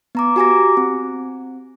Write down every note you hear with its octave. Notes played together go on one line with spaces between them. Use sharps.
B3 A#5 D6
F#4 G4 G#5 A#5 D6 A#6
C4